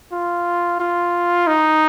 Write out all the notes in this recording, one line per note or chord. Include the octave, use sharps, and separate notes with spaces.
F4
F4
D#4